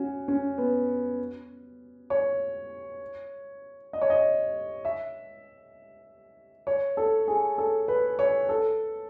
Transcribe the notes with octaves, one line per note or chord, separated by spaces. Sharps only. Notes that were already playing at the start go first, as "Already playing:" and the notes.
Already playing: C#4 F#4
C#4
B3
C#5
D#5
C#5
D#5
E5
C#5
A4
G#4
A4
B4
C#5
A4